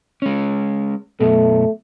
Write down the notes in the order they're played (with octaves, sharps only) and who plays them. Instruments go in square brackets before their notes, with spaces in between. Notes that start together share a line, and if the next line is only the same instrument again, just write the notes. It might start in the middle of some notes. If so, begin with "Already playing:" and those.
[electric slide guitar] G#3 C#4
[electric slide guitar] F#2 B2 [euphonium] A3